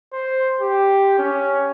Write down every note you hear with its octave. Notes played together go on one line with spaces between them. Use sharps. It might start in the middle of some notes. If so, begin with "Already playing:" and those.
C5
G4
C#4